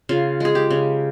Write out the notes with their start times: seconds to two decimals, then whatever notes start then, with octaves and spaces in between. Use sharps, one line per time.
0.09 C#3 F4
0.40 G#3 G#4
0.55 G4
0.70 C#3